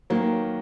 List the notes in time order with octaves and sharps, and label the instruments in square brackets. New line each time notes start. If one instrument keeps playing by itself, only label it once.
[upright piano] D#3 F#3 [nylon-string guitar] A#3